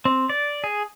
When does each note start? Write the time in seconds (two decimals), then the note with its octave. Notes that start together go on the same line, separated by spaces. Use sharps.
0.05 C4
0.29 D5
0.64 G#4